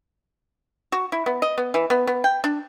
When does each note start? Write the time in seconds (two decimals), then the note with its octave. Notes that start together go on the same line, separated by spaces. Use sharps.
0.92 F#4
1.12 E4
1.26 B3
1.42 D#5
1.58 B3
1.74 E3
1.90 B3
2.07 B3
2.24 G5
2.44 D4